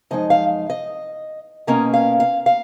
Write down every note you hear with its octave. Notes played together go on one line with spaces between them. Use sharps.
F#2 F3 G#3 D#4 D#5
F5
D#5
B2 A#3 C#4 D#5
F5
F5
F5